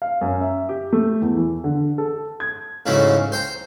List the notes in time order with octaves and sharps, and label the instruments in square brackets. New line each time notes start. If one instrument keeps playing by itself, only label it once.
[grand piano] F5
F#2
E5
G4
A3
E2
E3
D3
A4
G#6
[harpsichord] G#2 C#3 E3 F#3 A3 C#4
C5 G5 A#5